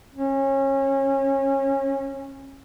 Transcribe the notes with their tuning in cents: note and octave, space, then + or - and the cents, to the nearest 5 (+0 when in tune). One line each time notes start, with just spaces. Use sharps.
C#4 -25